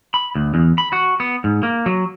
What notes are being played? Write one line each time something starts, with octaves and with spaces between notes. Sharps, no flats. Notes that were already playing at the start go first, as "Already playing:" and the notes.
B5
D2
E2
B5
F#4
B3
G#2
A#3
F#3